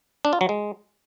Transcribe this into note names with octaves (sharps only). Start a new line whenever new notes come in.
D4
F4
F#3
G#3